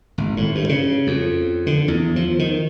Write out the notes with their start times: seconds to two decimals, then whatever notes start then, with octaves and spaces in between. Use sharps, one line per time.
0.18 G#1
0.37 A2
0.55 G2
0.69 C#3
1.07 F2
1.67 D3
1.88 E2
2.16 F3
2.39 D#3